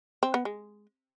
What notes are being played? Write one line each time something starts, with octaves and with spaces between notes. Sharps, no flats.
C4
B3
G#3